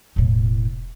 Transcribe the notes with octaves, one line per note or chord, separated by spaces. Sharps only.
E1 A2